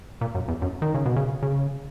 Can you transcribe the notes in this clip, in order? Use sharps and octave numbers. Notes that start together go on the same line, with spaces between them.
A#2
F#2
E2
F#2
D#3
C#3
B2
C#3
C#3